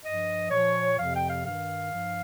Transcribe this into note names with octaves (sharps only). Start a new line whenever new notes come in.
G2 F3 D#5
A#2 F3 C#5
F2 C3 F3 F5
G5
F5
G2 D#3 F5
G2 F3